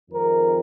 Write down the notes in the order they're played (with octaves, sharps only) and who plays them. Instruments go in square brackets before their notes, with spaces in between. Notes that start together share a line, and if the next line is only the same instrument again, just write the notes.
[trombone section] F2 D#3 G#3 C4 A#4